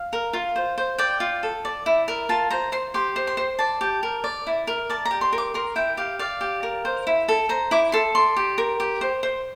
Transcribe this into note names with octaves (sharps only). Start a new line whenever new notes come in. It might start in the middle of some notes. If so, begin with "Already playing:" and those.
Already playing: F5
A#4
F4
C5
C5
D5 G5
F4
A4
D5
E4
A#4
F4 A5
C5 A#5
C5 C6
G4 C6
C5
C6
C5
D5 A5
G4
A#4
D5
E4
A#4
D5 A5
A#5
G4
C6
A#4
D6
A#4 C6
E4 G5
G4 F5
D5 F5
G4
A#4
C5
E4
A4
C5 A#5
E4 D6
A4 C6
D5 C6
G4
A#4
G4
C5
C5